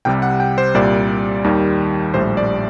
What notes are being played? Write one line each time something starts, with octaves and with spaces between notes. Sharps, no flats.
C2 C3 G3 G5
F#5
G5
C5
C2 A#2 G3 D5
D#2 D#3 G3
A#1 A2 G3 C5
D5